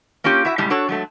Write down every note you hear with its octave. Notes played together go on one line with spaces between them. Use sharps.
A#3 C#4 F4 G4
E4 F#4 E5
A2 C#3 G3 G#3
D4 F#4 A4 C#5
F#3 G#3 A3